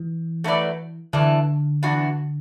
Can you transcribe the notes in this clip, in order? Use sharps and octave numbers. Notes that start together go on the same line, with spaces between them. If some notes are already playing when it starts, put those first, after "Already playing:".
Already playing: E3
F#3 A3 E4 B4 D5
E2 D3 E3 D4
E2 E3 D4 F#4